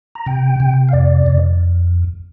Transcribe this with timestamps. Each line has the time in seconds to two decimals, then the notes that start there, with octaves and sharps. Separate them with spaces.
0.15 A#5
0.26 C3 G5
0.60 C3
0.89 F5
0.93 F2 D5
1.26 F2